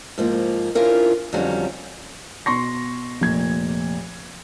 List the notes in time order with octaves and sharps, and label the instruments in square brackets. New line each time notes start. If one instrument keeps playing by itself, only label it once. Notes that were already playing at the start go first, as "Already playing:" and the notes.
[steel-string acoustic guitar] G#2 F3 A#3
C#4 D4 E4 F4 A#4 C5
F2 D3 D#3 F#3 G3 C#4
[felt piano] B2 C6 C#6 A#6
F1 A#2 G#6